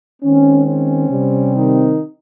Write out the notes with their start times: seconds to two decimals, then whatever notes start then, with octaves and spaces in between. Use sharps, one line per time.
0.22 D#3 G#3 C4 C#4
0.66 C#4
1.10 C3 G3 C4
1.54 D#3 D#4